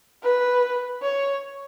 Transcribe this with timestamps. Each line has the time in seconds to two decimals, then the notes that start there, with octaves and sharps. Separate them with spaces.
0.23 B4
1.02 C#5